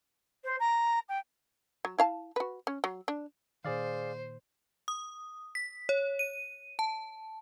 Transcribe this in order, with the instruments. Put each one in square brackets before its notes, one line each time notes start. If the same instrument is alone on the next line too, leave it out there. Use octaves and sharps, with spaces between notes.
[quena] C5
A#5
G5
[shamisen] F#3
E4 F5 A5
F#4 B4
C#4
F#3
D4
[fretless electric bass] A#2 D#3 [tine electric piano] G#4 D5 F5 [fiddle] C5
[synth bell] D#6
B6
C#5
D#7
A5